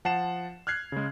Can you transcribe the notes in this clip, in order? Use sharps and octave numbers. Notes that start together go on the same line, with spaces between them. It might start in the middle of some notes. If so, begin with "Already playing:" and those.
F3 F#5 A5 C7 E7
F6 F#6 G#6 C7
C#3 G#3